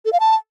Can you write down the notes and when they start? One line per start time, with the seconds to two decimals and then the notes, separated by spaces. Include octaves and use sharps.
0.05 A4
0.13 F5
0.20 A5